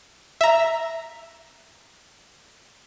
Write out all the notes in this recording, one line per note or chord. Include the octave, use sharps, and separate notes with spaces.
E5 A#5